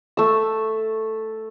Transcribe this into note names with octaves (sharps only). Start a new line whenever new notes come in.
A3 E6